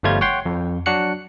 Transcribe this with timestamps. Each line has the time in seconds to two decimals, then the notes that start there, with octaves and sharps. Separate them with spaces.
0.03 G1 F3 G3 A3 F4 G#6
0.21 C#5 F#5 G5 C6
0.46 F2
0.86 F#3 D4 F#4 F#6 C#7